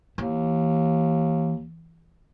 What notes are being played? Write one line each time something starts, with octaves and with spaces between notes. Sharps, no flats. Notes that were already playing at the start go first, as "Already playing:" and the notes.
D#2 E3